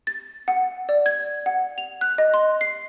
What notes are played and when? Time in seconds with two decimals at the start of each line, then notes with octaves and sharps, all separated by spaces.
0.07 A6
0.48 F#5
0.89 D5
1.06 G#6
1.46 F#5
1.78 F7
2.01 F#6
2.18 D#5
2.34 C6
2.61 C7